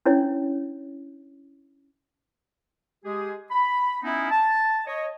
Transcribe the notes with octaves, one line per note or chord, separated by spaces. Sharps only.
C#4 D4 E4 C#5
G#3 G4 G#4
B5
B3 C#4 D#4 E4
A5
C#5 D#5